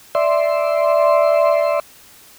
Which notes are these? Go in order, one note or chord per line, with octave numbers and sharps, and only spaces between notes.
D5 E5 C6